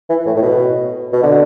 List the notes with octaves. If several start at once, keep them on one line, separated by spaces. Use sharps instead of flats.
E3
A2
A2
B2
B2
D3